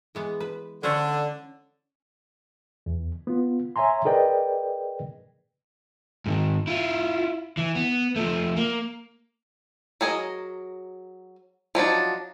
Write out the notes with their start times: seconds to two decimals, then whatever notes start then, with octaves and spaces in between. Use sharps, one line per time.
0.15 E3 G#3 B3
0.40 B4
0.83 D3 C#4 C5 C#5
2.86 E2
3.27 B3 F4
3.76 C#5 E5 G#5 A#5 C6
4.05 G#4 A#4 B4 D5 D#5 G5
6.26 G#2 D#3
6.67 E4 F4
7.57 E3
7.75 B3
8.16 F3 A3
8.57 A#3
10.01 F#3 G#4 A#4 D#5
11.75 F3 F#3 D4 D#4